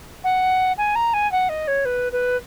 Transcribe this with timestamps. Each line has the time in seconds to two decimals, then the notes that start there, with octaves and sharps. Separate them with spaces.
0.24 F#5
0.77 G#5
0.95 A#5
1.13 G#5
1.31 F#5
1.49 D#5
1.67 C#5
1.85 B4
2.12 B4